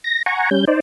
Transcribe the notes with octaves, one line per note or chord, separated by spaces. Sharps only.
A#6
F#5 G#5 A#5 C#6
G3 C#4 G6
D#4 C5 D5